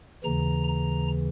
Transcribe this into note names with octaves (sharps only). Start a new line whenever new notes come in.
D#2 C#3 E3 A#5
A#5